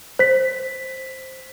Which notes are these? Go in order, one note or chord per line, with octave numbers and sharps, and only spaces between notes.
C5 B6